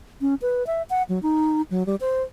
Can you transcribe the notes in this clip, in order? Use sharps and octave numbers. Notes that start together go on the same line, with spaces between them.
C#4
B4
E5
F#5
F#3
D#4
F#3
G3
C5